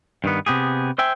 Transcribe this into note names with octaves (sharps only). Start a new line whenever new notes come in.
G2 D#3 B3
C3 B3 G4 G#4
C5 E5 G5 G#5